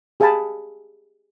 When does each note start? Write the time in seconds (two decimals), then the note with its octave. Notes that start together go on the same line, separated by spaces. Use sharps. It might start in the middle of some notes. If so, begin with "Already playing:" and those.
0.20 G4 G#4 F5 G#5 A5 B5